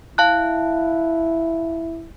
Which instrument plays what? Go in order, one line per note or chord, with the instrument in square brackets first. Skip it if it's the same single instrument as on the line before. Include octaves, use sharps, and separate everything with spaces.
[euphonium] E4 [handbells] F5 A5 F#6